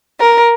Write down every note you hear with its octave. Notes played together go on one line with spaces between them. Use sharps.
A#4